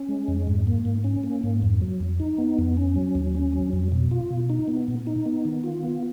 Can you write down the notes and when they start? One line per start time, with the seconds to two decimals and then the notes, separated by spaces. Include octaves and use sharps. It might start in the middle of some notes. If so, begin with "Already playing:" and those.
Already playing: C#4
0.09 G#3
0.28 F2
0.47 G#2
0.67 A#3
0.85 G#2
1.04 C#4
1.24 A#3
1.43 G#2
1.62 F2
1.81 F#3
2.01 F2
2.20 D#4
2.38 B3
2.58 F2
2.77 C#4
2.95 F#3
3.15 D#2
3.35 C#4
3.53 F#3
3.73 F2
3.92 B2
4.11 F4
4.31 B2
4.50 D#4
4.68 B3
4.88 A#2
5.07 D#4
5.26 B3
5.45 D#3
5.64 F4
5.83 B3